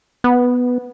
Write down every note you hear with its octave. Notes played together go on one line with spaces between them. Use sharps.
B3